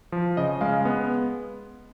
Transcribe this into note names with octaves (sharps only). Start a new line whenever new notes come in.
F3
C#3 D#5
G#3 F5
B3